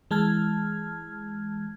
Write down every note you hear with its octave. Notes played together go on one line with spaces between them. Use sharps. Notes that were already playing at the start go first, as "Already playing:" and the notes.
E3 G#3 A5 F6 G#6